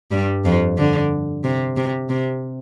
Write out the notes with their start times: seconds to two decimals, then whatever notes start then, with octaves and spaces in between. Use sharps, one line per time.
0.11 G2 G3
0.45 F2 F3
0.78 D3
1.44 C3
1.77 C3
2.09 C3